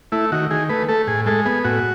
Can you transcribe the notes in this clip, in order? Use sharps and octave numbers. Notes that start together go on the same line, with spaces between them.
A3 E4
D#3 F#4
D#3 G#4
A3 B4
A3 A4
A2 G#4
G#3 A4
B3 G#4
A2 F#4